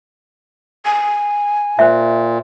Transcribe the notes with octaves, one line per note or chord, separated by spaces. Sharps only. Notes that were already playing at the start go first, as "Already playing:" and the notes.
G#5
A#2 C5 E5